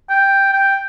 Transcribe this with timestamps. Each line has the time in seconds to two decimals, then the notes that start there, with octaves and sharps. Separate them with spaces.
0.09 G5
0.53 G5